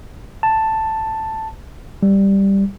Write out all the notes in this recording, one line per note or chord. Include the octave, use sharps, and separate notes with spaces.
A5
G3